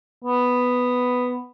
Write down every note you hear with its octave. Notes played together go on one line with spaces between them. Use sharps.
B3